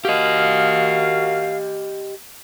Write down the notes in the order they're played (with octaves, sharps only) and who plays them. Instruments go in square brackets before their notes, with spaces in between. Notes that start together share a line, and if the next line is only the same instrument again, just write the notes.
[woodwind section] F#4 A#4 F5 [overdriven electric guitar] G4 D#5